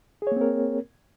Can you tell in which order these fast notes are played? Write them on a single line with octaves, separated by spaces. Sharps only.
G#4 C#5 A#3 C4 A#4